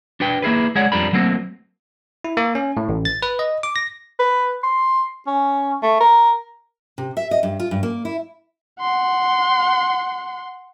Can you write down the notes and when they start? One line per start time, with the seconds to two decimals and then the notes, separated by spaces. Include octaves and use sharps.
0.20 D4 F#4 B4 G5
0.42 A#3 E4 G#4 B4
0.75 G#3 G#4 C#5 D5 F#5
0.92 F2 F3 G3 D4 A#4 B5
1.13 F#3 A3 A#3 C4 F#4
2.24 E4
2.37 A#3
2.55 C#4
2.77 A2
2.89 A1
3.05 A6
3.22 B4
3.39 D#5
3.63 D6
3.76 A#6
4.19 B4
4.63 C6
5.27 C#4
5.82 A3
6.00 A#4
6.98 C3
7.17 E5
7.31 D#5
7.43 G2
7.60 F4
7.71 G2
7.83 A#3
8.05 E4
8.81 F#5 C6